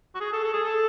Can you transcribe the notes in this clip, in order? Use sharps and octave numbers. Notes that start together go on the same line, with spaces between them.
F#4
G#4
A4
A4
G#4
A4